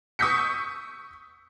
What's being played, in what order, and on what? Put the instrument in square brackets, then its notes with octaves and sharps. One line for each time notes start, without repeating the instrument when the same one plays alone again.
[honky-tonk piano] C#6 D#6 E6 G6 B6 C#7